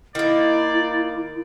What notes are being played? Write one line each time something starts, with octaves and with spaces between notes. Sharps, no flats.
D#3 A#3 E4 D5